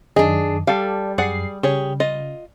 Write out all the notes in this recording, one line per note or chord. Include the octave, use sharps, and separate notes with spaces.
F#2 D#3 D4 G#4 D#5
G3 A4 D5 F5 A5
F#2 G#4 D5 F#5 C7
C#3 G4 G#4 C#5
F4 D#5